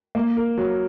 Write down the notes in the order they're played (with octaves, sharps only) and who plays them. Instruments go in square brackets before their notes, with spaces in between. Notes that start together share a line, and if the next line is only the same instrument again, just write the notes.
[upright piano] A#3
A#4
F#3